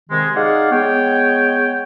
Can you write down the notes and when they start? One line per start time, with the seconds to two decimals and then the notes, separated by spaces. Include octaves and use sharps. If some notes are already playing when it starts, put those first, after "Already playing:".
0.10 C3 D#3 G#3
0.35 D#4 G#4 D5 F5 F#5
0.71 G#3 B3 C#5 G5